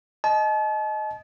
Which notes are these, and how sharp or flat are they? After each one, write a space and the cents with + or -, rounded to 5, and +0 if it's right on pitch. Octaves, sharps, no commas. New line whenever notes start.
D#5 +0 A5 -40